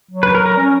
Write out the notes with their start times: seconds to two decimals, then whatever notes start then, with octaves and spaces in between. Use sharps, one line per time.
0.11 F#3
0.23 B4
0.35 A#4
0.46 A#4
0.58 C#4